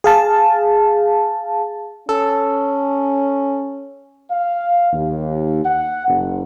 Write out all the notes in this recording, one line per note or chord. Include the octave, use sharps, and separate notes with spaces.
G#4 F5 A5
C#4 A4
F5
D#2
F#5
F#1